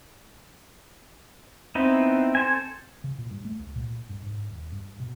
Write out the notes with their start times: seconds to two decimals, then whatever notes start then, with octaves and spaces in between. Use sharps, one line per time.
1.75 B3 C4 D#4 E4
2.35 A4 C5 G#5
3.04 C#3
3.18 A#2
3.30 G2
3.45 A3
3.59 C#2
3.76 A#2
4.09 G2
4.26 G#2
4.50 D#1
4.72 G2
5.00 B2